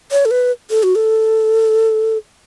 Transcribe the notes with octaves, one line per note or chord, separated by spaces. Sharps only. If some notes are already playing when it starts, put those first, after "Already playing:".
C#5
A4
B4
A4
F#4
A4